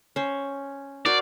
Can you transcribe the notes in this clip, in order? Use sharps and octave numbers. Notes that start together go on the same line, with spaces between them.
C#4 C5
F#4 A#4 C5 D5